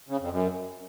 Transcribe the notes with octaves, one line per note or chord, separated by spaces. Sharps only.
C#3
F2
F#2